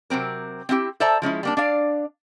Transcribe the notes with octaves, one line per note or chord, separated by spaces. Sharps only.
C3 F#3 C4 A#4
C4 E4 F4 G4
A4 C5 D5 E5 A5 A#5
F3 G#3 C#4 E4
G3 A#3 D4
D4 D5 F5